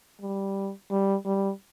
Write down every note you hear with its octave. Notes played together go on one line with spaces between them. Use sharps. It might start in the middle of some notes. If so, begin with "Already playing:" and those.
G3
G3
G3